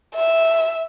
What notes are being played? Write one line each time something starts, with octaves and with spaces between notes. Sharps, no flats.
E5